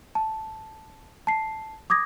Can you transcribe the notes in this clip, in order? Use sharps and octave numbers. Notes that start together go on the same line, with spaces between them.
A5
A5 C7
D6 D#6 G#6 A#6